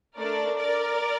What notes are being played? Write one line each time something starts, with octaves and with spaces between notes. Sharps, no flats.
A3 D4 A4 A#4 D5
A#4 D5